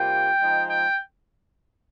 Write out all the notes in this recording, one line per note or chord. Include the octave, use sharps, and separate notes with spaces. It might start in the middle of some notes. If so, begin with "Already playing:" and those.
Already playing: C3 G3 A#3 F4 G5
F3 G#3 D#4
G5